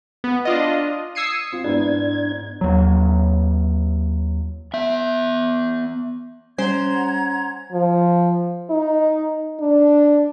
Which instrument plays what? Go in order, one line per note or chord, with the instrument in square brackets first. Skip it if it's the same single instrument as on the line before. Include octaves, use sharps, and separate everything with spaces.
[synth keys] B3
D4 F4 D#5
D#6 E6 G#6 C7 C#7 D#7
[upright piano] C4 F4
[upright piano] G#2 B3 E4 [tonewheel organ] D4 G#6
[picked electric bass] D#2 F#3
[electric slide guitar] B3 E5
[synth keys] G3 [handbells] C#4 [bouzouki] C5 [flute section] F#5 A#5 G#6
[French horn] F3
D#4
D4